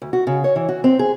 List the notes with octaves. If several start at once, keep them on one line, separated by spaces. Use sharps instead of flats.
D2
F#4
C#3
C#5
E3
F#4
C4
G#4